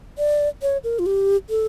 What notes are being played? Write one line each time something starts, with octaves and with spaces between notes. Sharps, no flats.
D5
C#5
A#4
F4
G4
A4